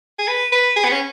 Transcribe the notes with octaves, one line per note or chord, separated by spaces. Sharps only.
G#4
B4
B4
G#4
B3
C#4